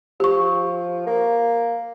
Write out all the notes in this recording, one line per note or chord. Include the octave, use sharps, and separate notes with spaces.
F3 G4 C#6
A#3